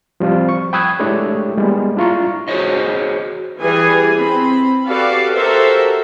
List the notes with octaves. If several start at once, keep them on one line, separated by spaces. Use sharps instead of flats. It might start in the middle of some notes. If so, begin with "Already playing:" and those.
F3 G3 C4 F4
C#6
G5 B5 D#6 E6 F#6 G#6
G#3 A3 D4 E4 G4 C#5
G3 G#3 A#3 B3
D4 E4 F4 A#5 C#6
F#4 G#4 C5 C#5 D#5
E3 G3 G#4 G#5
C4 B5
F#4 G4 A4 B4 D5 F5
F#4 G4 A4 A#4 C5 E5